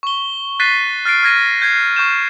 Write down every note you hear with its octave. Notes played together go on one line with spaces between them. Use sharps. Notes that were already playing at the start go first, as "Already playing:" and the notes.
C#6 G7
F#6 A6 B6 C7 D#7
F6 A6 C7 D7
F6 G#6 A#6 D#7
G6 G#6 C7
C#6 G6 E7